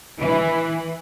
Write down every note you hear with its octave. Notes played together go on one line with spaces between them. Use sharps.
E3